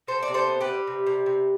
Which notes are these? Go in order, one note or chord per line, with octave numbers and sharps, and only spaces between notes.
C3 A4 C5
D5
C3
A4 C5
B3
G4 B4
G3
C3
C3
C3